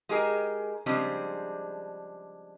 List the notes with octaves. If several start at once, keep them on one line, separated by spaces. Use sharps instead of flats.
G#3 D#4 G4 G#4 A#4
C#3 F3 G3 G#3 C4 D4